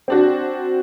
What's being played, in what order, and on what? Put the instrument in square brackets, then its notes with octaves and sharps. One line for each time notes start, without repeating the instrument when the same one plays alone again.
[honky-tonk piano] C4 D4 F#4